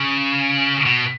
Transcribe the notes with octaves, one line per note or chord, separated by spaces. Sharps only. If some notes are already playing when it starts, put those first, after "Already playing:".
Already playing: C#3
B2